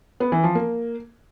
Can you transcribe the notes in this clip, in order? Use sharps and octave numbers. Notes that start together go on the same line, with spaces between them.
B3
E3
F3
A#3